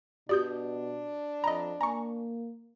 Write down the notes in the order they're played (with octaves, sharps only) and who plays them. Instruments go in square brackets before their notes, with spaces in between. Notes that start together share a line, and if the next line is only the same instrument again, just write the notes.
[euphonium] B2 [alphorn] D4 [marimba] F#4 G4 D#6 [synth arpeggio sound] D5 G6
[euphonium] F2 [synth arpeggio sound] D#5 A#5 [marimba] B5
[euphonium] A#3 [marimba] G#5 [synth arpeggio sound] A#5 C#6